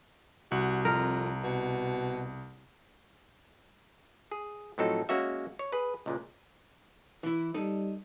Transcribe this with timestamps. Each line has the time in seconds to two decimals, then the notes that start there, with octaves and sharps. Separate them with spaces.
0.51 C2 F#4
0.85 F2 A#4
1.43 B2
4.31 G#4
4.78 A2 F3 F#3 C4 D#4 A4
5.09 G#3 A#3 C#4 F#4 E5
5.59 C#5
5.72 G#4 B4
6.06 C#2 A#2 G#3
7.23 E3 E4
7.54 G3 D#4 A4